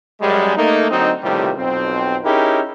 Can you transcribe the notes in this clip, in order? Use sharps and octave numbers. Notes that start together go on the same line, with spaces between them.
F#2 G3 G#3
A3 A#3 D#4
D3 F#3 C4 D#4
C#2 A2 C3 D#3 F3 G3
B1 F2 C4
C#4 D#4 E4 G4 G#4 A#4